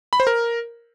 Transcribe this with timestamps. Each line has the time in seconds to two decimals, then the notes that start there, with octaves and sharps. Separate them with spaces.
0.13 B5
0.20 C5
0.27 A#4